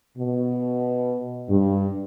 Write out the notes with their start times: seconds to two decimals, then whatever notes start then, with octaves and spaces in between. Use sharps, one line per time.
0.18 B2
1.49 G2